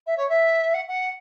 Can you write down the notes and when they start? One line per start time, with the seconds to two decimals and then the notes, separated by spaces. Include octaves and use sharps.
0.07 E5
0.17 C#5
0.29 E5
0.74 F#5
0.88 F#5